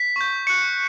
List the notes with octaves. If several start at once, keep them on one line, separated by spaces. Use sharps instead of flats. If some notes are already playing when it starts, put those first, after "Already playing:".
Already playing: B6
C#6 G6
C#6 F#6 C#7